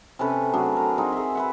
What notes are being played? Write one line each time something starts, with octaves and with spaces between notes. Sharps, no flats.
C3 C#4 A4 B4
F#3 A3 D4 G#4
A#4
C4 D#4 G#4
G#4 E5
B4 E5 F#5